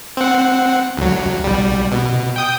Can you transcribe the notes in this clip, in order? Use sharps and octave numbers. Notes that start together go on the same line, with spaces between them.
C4 F#5
D2 F#3
B1 G3
B2
G5 D#6 G6